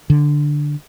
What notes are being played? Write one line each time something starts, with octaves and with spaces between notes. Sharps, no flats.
D3